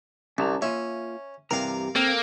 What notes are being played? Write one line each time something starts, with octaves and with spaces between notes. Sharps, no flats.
C2 C#4 A5 A#5
A#3 C#4 F4 E5
G2 C3 E3 A#4 F5 A#5
A#3 C4 A4